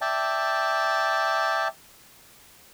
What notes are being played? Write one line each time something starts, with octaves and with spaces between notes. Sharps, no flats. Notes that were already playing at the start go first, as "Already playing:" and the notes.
D5 E5 G5 A5